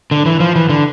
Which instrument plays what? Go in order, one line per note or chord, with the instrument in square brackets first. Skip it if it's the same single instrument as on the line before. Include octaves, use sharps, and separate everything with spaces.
[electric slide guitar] D3
E3
F3
E3
D3